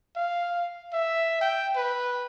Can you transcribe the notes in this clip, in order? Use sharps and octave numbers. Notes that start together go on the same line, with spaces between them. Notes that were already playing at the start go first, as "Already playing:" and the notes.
F5
E5
G5
B4